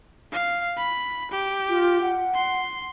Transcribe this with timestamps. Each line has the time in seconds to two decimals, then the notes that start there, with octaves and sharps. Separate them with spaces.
0.32 F5
0.77 B5
1.31 G4
1.69 F4
2.02 F#5
2.34 C6